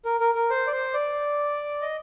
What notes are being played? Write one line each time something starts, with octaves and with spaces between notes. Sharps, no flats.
A#4
A#4
A#4
C5
D5
C5
D5
D#5